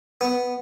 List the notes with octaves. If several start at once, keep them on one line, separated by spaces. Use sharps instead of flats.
B3